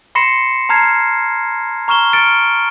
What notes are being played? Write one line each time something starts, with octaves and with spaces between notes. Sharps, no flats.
B5 C6 A#6 C7 C#7 E7
A5 A#5 F6 G#6 C7
A#5 C#6 F6 E7 G7
F6 A6 C#7 D7